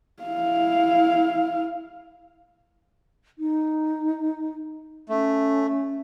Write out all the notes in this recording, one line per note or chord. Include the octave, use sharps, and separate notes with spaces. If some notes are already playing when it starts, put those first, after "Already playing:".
E4 F5
D#4
A3 C#4